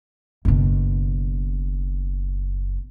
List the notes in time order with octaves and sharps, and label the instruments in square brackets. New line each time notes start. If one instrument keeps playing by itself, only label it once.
[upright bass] F#1 B2